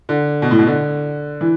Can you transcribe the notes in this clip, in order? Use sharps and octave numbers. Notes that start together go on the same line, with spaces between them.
D3
B2
A2
B2
D3
E3